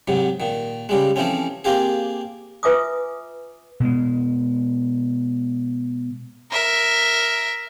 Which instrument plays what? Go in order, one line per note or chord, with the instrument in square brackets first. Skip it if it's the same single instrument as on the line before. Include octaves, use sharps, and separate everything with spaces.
[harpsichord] G#2 C3 F#3
A#2 D#3
C#3 G3 G#3
E3 F3 A3 C4 C#4
A#3 C4 F4 G4 G#4
[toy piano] F4 B4 E5 G#5 D6 D#6
[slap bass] B2 G#3
[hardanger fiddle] A#4 E5